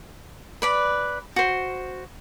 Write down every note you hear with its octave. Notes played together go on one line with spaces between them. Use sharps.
B4 D5 B5
F#4 C5